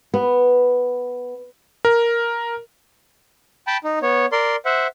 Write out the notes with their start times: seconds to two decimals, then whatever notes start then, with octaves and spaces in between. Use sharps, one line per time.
0.14 B3
1.85 A#4
3.67 G5 A5 B5
3.84 D#4
4.02 B3 C#5
4.32 A#4 D5 C6
4.65 C5 E5 F#5